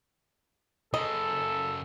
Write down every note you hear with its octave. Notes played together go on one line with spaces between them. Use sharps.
F#2 C#3 A4 D#5